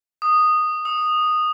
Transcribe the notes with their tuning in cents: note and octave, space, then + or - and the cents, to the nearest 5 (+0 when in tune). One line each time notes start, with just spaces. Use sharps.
D#6 -10
D#6 +45